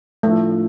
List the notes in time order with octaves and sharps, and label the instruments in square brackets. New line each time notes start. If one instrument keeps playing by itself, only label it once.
[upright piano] A2 F3 D4 F4 [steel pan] A3